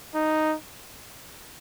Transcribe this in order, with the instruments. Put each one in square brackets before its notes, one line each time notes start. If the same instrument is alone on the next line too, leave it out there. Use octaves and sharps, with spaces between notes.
[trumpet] D#4